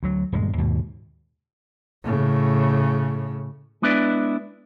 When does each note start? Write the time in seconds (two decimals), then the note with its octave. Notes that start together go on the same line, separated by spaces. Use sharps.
0.03 D2 F#3
0.32 D#1 D2 G2 G#3
0.58 D#2 G#2 B2
2.03 A2 C#3
3.82 G#3 B3 D4 E4 B4 D5